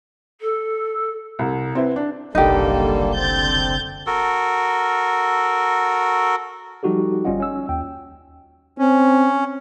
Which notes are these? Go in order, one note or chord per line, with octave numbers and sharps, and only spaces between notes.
A4
C2
C4 E4 B4
D4
F#1 C2 D3 G3 A#3 D#4 G4 A4
D3 C4 G6 A6
F#4 A4 A#4
F3 G3 D#4 F#4 G4 A4
G1 G3 C#4 F4 D#5 F#5
C#4 E6
D#2 G5
C4 C#4